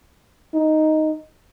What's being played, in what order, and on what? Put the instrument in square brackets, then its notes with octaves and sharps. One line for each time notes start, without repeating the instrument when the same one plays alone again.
[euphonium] D#4